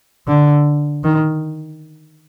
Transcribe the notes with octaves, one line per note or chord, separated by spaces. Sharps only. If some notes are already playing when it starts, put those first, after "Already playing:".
D3
D#3